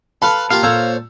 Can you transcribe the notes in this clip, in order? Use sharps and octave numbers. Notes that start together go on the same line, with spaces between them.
A4 B4 F5 A5 B5 C6
A#3 F4 G4 F5
A#2 A4 C5 C#5 A#5 E6